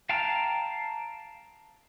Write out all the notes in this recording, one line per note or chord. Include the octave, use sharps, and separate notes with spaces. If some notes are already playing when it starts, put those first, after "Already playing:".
F5 G5 A5 A#5 F6